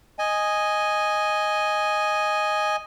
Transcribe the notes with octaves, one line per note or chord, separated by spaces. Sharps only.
D#5 G#5